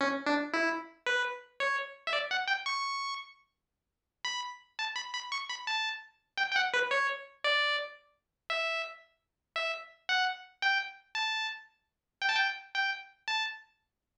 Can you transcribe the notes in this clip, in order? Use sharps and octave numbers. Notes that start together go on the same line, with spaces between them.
C#4
D4
E4
B4
C#5
E5
D5
F#5
G5
C#6
B5
A5
B5
B5
C#6
B5
A5
G5
G5
F#5
B4
C#5
D5
E5
E5
F#5
G5
A5
G5
A5
G5
G5
A5